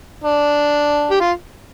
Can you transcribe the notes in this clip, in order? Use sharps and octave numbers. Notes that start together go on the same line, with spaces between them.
D4
G4
F4